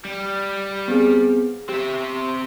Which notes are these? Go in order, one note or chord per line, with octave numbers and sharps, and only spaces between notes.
G3
B3 C4 G#4
C4 G4 E5